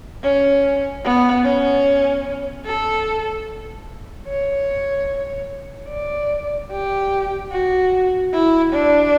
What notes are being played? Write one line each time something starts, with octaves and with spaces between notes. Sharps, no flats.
C#4
B3
C#4
A4
C#5
D5
G4
F#4
E4
D4